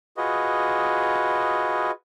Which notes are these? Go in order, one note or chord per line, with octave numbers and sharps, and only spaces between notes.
F4 F#4 G#4 B4 D#5